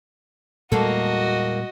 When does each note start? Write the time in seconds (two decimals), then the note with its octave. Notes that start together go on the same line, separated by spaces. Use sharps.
0.72 E2 A#2 G3 G#3 A#3 F#4 A4 D#5